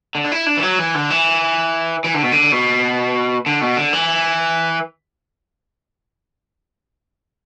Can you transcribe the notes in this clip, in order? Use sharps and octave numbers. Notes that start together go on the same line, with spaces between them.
D3
D4
E4
D4
E3
F#3
E3
D3
E3
E3
D3
B2
D3
B2
D3
B2
D3
E3